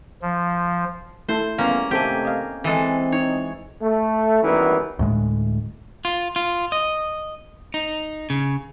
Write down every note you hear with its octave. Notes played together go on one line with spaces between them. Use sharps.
F3
A3 E4 A4 C5
E2 G3 A#3 B3 C#4 F5 A#5
C3 D#3 A3 C4 G4 A4 G#5
D#5 F5
E3 G#3 C4 A4
D#4 C#5
A3
F#2 D#3 E3 G3 A#3 B3
D2 A2 G#3
F4
F4
D#5
D#4
C#3